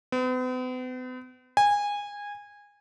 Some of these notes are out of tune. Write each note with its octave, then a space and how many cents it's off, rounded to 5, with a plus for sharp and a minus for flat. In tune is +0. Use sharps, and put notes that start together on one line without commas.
B3 +45
G#5 -20